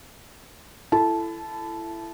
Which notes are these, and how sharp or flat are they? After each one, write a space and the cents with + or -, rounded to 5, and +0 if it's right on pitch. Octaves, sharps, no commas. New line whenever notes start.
E4 +25 A4 +0 A5 -15